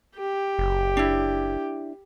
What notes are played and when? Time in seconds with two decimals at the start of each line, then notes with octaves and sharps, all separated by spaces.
0.16 G4
0.59 F#1
0.97 D4 E4